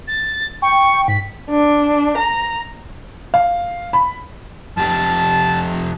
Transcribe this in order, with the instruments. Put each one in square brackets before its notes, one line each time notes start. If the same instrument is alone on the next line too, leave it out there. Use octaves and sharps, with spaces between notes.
[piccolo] A6
[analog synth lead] G5 [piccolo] C#6
[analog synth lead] G#2 [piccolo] B6
[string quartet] D4
A#5
[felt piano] F5
B5
[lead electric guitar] F2 G4 [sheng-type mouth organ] A5